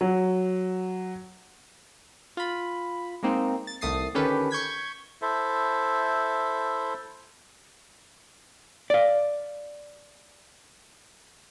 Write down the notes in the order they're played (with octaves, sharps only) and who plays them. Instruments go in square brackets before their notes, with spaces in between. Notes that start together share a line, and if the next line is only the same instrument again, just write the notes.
[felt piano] F#3
[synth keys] F4 B5
G#3 A#3 C4 D#4
A6
C2 D#3 A3 D#6 A6 C7
D3 D#3 C#4 G4 A4 B4
C#6 G6 G#6 B6
[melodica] E4 A4 C5 E5
[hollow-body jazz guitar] D5 F5